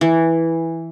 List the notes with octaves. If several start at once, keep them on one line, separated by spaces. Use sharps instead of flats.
E3